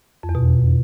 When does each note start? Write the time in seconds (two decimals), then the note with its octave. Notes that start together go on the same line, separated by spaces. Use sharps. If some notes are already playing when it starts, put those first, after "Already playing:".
0.23 F2
0.29 E2
0.35 B2